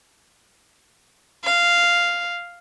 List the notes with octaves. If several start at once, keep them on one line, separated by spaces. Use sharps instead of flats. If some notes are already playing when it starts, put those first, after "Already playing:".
F5